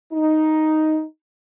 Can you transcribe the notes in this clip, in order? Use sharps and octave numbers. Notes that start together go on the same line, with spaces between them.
D#4